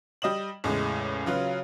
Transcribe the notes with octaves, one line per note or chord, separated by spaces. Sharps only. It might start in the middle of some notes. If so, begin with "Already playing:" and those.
G3 D#5 D#6 E7 F#7
E2 A2 C#3 G#3
C#3 F#3 F4 B4